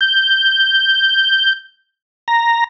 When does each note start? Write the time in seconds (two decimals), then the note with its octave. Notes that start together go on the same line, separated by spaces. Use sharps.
0.01 G6
2.28 A#5